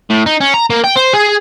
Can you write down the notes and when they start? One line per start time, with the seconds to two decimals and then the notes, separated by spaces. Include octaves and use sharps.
0.10 A2
0.26 D#4
0.41 C#4
0.54 A#5
0.70 A#3
0.84 G5
0.96 C5
1.14 G#4